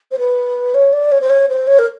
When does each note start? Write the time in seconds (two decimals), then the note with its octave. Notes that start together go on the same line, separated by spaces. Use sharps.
0.11 C5
0.19 B4
0.74 C#5
0.92 D5
1.11 C#5
1.21 C5
1.29 C#5
1.49 C5
1.67 C#5
1.79 A#4